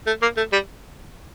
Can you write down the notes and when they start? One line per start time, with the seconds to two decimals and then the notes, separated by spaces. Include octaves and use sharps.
0.07 A3
0.22 A#3
0.37 A3
0.52 G3